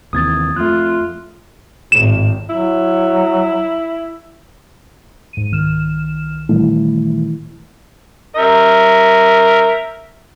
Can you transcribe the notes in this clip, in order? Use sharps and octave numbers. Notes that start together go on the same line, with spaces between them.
D#2 C3 E3 D#6 G#6 A6
F2 A3 F4 F#6
G#1 A2 E7
F#3 E4
G#2 D#7
C2 D#3 F6 E7
A#2 D#3 E3 G3 A3 E4
A#4 E5